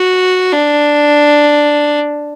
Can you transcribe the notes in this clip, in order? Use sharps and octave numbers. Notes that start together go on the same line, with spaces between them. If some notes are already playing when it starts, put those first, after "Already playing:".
Already playing: F#4
D4